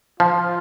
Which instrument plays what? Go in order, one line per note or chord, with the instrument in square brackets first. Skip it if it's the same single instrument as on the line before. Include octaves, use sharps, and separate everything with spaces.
[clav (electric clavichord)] F3 [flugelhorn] F4